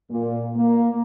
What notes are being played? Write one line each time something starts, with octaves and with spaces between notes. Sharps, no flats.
A#2
A#3